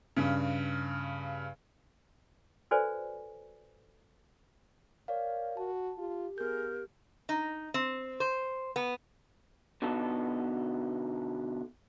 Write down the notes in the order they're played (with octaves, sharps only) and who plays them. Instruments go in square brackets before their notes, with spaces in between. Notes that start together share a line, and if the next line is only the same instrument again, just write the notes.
[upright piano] G2 C#3
[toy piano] F#4 A4 B4 C5 D5 G#5
[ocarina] A#4 [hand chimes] C#5 D5 F5
[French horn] F#4 [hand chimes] A5
[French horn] F4 [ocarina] G4
[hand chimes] B3 G6 [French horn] G#4 [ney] A#4
[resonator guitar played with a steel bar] D#4
C4
C5
B3
[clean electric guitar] B2 D3 B3 D#4 A4